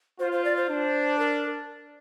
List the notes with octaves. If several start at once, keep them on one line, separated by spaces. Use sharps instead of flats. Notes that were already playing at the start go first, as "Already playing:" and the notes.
F4 C5
C5
D5
C5
D4
A#4